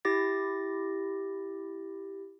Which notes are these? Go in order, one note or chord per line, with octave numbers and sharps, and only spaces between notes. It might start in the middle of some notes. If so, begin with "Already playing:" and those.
E4 G4 A6 A#6